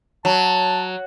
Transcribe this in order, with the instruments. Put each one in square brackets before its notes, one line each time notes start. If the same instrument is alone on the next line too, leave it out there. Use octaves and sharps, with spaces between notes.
[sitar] F#3 [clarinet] A5